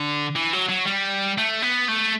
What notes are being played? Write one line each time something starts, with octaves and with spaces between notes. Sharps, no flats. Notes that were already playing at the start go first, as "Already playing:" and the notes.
Already playing: D3
E3
F#3
F#3
G3
A3
B3
A3